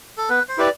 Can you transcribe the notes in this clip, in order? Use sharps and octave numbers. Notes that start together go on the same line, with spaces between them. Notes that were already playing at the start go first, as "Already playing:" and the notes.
A4
B3 B4
C5
E4 G4 B4 D5